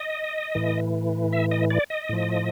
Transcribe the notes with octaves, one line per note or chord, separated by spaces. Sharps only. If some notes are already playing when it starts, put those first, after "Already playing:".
Already playing: D#5
A2 E3
E5
D#5
D5
D#5
A2 F3